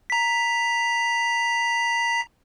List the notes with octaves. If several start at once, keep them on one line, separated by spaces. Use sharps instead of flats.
A#5 B6